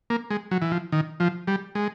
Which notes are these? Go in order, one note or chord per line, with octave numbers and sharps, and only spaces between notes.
A#3
G#3
F#3
E3
F3
D#3
F3
G3
G#3